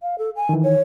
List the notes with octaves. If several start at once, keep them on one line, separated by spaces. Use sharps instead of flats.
F5
A4
G#5
D#3 E3
C#5